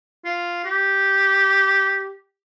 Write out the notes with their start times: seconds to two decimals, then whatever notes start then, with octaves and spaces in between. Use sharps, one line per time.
0.25 F4
0.65 G4